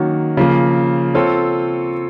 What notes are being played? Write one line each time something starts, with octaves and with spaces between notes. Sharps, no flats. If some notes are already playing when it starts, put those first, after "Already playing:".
Already playing: D#3 F#3 A#3 C#4 F#4
C#3 F3 A#3
C4 F4 A4 C#5